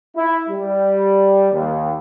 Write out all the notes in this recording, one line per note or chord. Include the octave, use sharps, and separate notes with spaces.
E4
G3
D#2